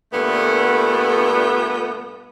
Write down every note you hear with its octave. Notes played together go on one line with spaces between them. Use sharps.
G2 A#2 D3 A3 B3